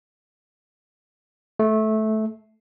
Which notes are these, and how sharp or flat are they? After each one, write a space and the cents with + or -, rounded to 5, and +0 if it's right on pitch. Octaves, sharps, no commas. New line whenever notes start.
A3 -15